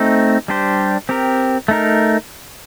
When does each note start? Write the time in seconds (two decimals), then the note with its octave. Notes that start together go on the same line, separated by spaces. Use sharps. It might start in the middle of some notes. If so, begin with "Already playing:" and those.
Already playing: A3 C4 D#4
0.48 G3 D4 G4 C5
1.09 C4 G4 A#4
1.68 A3 D#4 A#4